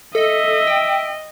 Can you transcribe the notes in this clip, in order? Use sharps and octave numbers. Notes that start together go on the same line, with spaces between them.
A4 D#5 E5
G5